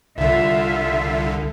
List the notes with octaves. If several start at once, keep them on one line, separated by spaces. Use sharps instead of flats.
C2 D3 F4 E5